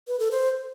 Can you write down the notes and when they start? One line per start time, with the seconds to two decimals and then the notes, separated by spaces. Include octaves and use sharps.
0.08 B4
0.19 A4
0.31 C5